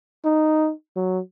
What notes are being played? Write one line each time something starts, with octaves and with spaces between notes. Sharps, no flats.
D#4
F#3